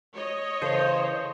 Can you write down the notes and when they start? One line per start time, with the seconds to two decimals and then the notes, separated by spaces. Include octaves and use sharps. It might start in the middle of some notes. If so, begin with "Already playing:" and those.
0.16 C#5 D#5
0.62 C#3 E3 A4 C5